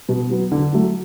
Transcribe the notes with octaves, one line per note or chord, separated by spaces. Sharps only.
B2
F#3 B3
D3
F#3 A3